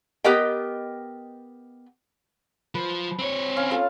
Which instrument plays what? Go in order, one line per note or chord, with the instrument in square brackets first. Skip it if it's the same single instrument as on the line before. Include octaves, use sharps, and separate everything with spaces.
[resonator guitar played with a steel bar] B3 G4 A#4 D#5 G5
[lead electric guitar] F3 [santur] B4
[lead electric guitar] C4 C#5
[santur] C#4 F5
F4 A4 F5